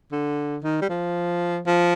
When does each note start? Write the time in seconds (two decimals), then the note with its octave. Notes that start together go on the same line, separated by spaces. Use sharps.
0.12 D3
0.63 D#3
0.82 G3
0.89 F3
1.66 F3